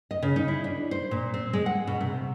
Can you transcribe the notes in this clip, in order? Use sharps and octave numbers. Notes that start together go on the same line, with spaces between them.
D#5
C#3
D#4
E4
D4
C5
A#2
C4
G#3
F#5
B2
C3